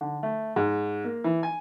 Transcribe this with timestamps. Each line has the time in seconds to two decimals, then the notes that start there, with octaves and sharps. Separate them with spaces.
0.01 D3
0.23 A3
0.56 G#2
1.04 A#3
1.24 E3
1.43 G#5